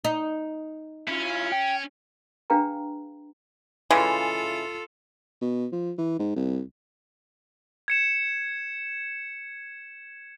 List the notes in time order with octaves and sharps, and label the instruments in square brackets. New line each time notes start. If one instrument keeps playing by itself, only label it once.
[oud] D#4
[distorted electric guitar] C#4 [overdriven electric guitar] E4 F4
[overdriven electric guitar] G5
[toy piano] D4 G#4 B4 F5 G5 A#5
[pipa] C#3 E3 G#3 [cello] F4 A4
[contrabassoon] B2
F3
E3
G#2
C2
[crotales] G#6 C#7 E7